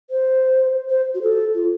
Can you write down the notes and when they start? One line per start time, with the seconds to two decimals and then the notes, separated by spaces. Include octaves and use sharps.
0.10 C5
0.89 C5
1.15 F#4
1.22 A4
1.55 F4